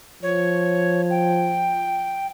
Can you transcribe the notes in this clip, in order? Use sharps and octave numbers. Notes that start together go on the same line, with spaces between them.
F3 C#5
G5